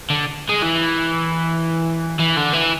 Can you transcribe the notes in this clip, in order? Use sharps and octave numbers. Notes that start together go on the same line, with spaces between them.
D3
G#3
E3
E3
D3
E3